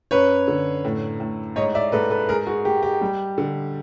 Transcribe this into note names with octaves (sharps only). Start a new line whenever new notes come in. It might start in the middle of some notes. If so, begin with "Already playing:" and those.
F#2 B4 C#5
D3
A2
A2
G#2 C#5 D#5
D5 E5
G#2 A4 B4
A4 B4
G#3 G#4 A#4
F#4 G#4
G#3 G4
G4
G3
D3